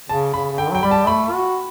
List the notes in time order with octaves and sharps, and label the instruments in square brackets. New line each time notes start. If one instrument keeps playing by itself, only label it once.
[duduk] C#3 [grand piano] A5
[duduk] C#3 [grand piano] B5
[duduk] C#3
[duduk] D3 [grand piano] G5
[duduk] F#3 [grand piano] G5
[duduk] G3 [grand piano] B5
[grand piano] A5
[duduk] A3 [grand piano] B5
[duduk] F#4